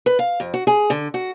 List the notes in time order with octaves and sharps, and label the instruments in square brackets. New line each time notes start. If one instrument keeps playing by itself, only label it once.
[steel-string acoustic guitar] B4
F5
F2
F#4
G#4
D3
F#4